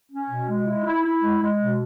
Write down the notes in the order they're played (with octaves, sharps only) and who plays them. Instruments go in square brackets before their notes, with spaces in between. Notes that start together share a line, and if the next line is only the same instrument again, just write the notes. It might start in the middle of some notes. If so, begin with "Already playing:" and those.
[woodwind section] C#4
B2
G#3
E4
E4
E4
G#3
G#3
B2